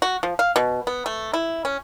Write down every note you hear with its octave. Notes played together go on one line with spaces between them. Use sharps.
F#4
F3
F5
B2
B3
A3
E4
C#4